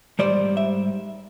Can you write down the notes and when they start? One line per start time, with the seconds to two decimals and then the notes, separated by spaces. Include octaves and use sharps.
0.19 G#2 D#3 G3 C5 D5
0.57 E5